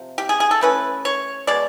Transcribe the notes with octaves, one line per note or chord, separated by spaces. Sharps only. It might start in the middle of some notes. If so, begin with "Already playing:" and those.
Already playing: C3 F3
G4
G#4
G#4
A4
E3 A3 C#4 B4
C#5
B2 G#3 D5